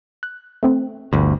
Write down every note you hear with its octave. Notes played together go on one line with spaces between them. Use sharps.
F#6
A3 C4
G1 D2